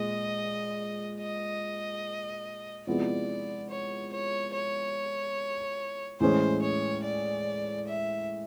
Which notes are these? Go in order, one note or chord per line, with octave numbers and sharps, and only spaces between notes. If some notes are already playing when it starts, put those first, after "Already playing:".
Already playing: A#2 G#3 D#5
D#5
C3 F3 G#3 B3 E4 D5
C#5
C#5
C#5
A2 E3 G#3 C#4 C5
C#5
D5
E5